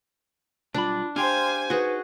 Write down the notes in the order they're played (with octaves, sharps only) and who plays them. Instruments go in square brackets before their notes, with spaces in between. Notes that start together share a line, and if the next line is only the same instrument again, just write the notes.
[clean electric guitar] B1 G3 B5 [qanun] D4 [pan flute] F4
[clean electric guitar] D4 G4 G5 [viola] C5 G#5 [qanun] F5 [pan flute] C6
[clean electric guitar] D#4 [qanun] F#4 G#4 [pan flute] B4